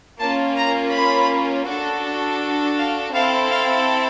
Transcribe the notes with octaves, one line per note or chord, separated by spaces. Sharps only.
A#3 C#4 F4 A5
A#5
B5
D4 F#4 A4
F5
C4 E4 A4 F5
F5